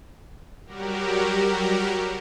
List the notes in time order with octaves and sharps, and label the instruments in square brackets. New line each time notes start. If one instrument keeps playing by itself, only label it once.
[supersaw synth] F#3 G3 F#4 G4 A#4